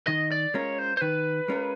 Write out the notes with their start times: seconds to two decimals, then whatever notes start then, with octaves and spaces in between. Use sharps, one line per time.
0.07 D#3 D#5
0.32 D5
0.54 G#3 C#4 F4 A#4 C#5
0.79 C5
0.97 C5
1.01 D#3 B4
1.48 G#3 C#4 F4 A#4